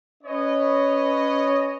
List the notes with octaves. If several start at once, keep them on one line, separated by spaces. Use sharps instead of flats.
C#4 B4 C#5 D#5